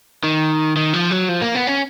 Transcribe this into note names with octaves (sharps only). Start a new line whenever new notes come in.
D#3
D#3
F3
F#3
F3
A#3
B3
C#4